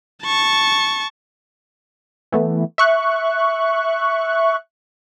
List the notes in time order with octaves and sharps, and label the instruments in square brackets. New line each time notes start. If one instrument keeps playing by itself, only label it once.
[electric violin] A5 C#6
[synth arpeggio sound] E3 A3 B3
E5 C#6 F#6